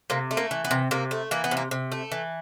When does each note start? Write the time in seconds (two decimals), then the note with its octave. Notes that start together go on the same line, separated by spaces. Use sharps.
0.10 C3 A#3
0.31 A3
0.37 A#3
0.51 E3
0.65 B3
0.71 C3
0.91 C3 A#3
1.11 A3
1.31 E3 A#3
1.44 B3
1.51 C3
1.57 A#3
1.71 C3
1.92 A3
2.12 E3